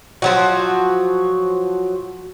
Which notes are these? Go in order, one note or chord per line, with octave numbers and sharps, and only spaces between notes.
F3 F#3 F#4